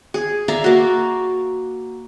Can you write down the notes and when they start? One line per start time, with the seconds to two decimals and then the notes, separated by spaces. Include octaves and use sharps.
0.14 G#4
0.48 D5 E5 F5 A#5
0.64 A#3 F#4